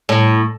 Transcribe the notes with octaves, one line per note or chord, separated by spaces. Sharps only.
A2